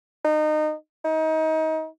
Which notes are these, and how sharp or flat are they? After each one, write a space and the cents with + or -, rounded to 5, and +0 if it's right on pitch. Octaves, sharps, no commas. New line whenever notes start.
D#4 -25
D#4 +30